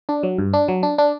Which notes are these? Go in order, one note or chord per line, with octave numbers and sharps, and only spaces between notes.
D4
F#3
G2
D4
F#3
D4
D4